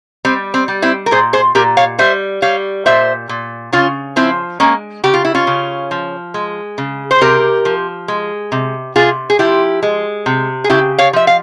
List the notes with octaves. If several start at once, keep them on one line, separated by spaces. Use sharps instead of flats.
G3 C4
C4
G3
C4 E4
A#4
A#2 G#4 C5
G#4 C5
A#2 G4 A#4
C#5 F5
G3 C5 E5
G3 C#5 F5
A#2 C5 E5
A#2
C#3 C#4 F4
F3 C4 E4
G#3 A#3 C#4
C#3 G4
F4
E4
C#4 F4
C#3
F3
G#3
C#3
C5
C3 G4 A#4
F3
G#3
C3
C3 F4 G#4
G#4
F3 E4 G4
G#3
C3
G#4
C#3 E4 G4
C#5 F5
F3 E5
F5